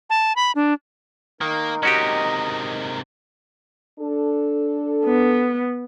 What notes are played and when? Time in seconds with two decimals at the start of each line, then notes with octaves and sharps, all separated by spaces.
0.10 A5
0.36 B5
0.55 D4
1.41 D#3 A#3 D#4 A#4
1.83 C3 G#3 C#4 F#4 G4 D#5
4.00 D4 A4
5.05 B3